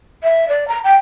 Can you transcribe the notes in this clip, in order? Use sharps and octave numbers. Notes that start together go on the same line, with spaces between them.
E5
D5
A#5
G5